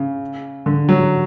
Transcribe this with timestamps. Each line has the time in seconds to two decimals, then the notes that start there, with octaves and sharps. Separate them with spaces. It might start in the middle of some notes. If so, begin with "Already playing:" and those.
Already playing: C#3
0.66 D3
0.89 F#3